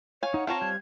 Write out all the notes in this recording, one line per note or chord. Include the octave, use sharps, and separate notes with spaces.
C#5 F5 G#5
D#4 F#5
C4 F4 C#5 F5 A5 A#5
G3 C5 F5 G#6